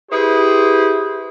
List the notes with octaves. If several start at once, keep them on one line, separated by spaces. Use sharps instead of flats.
E4 G4 G#4 B4 C5